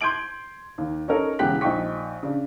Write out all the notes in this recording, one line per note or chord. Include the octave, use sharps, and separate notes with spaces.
C6 G6 G#6 D7 F#7
D#2
C#4 D#4 A4 A#4 C#5 D#5
E1 E2 C#3 G4 F#6 B6
A#1 D#4 G5 C#6 B6
C#3 D4